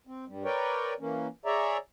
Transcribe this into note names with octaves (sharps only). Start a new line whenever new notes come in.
C4
G2 G3
A#4 B4 C#5 D5 G5
E3 A#3 C#4
G#4 C#5 D5 E5 A#5